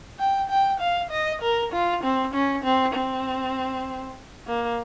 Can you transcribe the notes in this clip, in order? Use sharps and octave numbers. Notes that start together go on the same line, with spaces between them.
G5
G5
F5
D#5
A#4
F4
C4
C#4
C4
C4
A#3